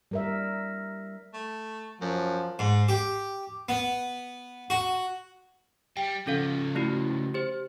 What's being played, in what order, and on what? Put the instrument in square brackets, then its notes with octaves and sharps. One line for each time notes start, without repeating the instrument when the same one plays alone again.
[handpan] G3 A#4 E5
[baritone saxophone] A3
[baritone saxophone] F#2 [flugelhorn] F3
[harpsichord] G#2
G4
B3
F#4
[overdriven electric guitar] G3 [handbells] G5
[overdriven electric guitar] C#3 F3 [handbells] C#4 A4 F5
[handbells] A3 E4 F#4
G4 C5